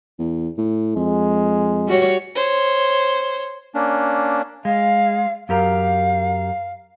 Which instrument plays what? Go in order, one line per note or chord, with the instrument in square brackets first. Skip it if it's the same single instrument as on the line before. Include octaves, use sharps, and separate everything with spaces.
[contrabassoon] E2
A2
[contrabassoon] F2 [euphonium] G#3
[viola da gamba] G3 F#4 C#5
[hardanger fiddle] C5 C#5
[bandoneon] A#3 C#4 D4
[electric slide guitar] G#3 [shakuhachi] F5
[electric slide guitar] F#2 G4 A#4 [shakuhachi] F5